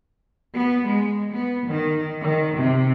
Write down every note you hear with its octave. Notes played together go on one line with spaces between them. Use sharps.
B3
G#3
B3
D#3
D#3
C3